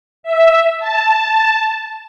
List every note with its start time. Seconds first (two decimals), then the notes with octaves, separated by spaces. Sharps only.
0.23 E5
0.79 A5